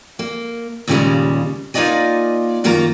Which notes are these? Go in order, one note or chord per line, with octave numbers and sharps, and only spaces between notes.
A#3
D#2 A#2 C#3 E3 G3 G#3
A#3 D#4 F4 D5 D#5 G#5
F#2 D#3 A#3 F4 A#5